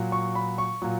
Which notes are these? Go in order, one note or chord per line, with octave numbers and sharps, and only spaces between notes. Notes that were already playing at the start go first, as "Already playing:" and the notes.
Already playing: A#2 F#3
C#6
B5
C#6
A#2 F#3